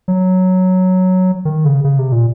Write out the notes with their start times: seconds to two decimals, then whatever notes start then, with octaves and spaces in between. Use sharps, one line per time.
0.08 F#3
1.45 D#3
1.65 C#3
1.84 C#3
1.99 C3
2.12 A#2